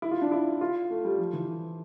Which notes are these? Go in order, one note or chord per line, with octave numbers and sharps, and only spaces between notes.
E4
F4
D4
E4
F4
A3
G3
F3
E3